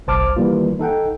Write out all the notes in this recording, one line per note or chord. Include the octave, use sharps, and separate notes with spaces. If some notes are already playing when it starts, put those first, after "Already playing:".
G1 C2 C5 A5 D6 F6
D#3 E3 G3 A#3 F4
D#4 A4 F#5 G5